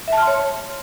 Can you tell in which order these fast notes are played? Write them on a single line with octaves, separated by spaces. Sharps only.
E5 A5 F6 C6 C#5